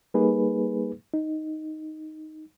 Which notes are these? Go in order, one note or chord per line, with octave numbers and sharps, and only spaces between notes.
G3 A#3 D#4 G#4 B4
D#4